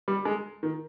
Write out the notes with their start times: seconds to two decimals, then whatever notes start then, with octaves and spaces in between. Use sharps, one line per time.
0.08 G3
0.25 G#3
0.63 D#3